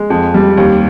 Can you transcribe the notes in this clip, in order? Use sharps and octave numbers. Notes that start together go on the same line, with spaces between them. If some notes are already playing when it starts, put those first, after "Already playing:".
Already playing: G#3
F2
G3
D#2